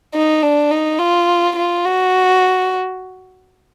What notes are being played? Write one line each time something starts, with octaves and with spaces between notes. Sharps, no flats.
D#4
D4
D#4
F4
F4
F#4